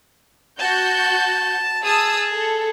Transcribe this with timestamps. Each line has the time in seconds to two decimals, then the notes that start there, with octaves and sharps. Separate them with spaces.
0.59 F#4 A5 G6
1.84 G#4 A5 D#6 E6
2.33 A4